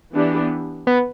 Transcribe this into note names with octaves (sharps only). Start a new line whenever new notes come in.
E3 B3 D4 G4
B3